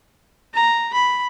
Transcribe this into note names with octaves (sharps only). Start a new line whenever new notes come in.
A#5
B5